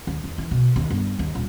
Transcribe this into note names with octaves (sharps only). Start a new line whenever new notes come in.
D#2
E2
E3
B2
D#2
G1
D#2
D#1